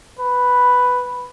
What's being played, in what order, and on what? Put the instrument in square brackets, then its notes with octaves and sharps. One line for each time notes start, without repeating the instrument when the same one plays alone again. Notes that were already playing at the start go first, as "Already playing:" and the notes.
[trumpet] B4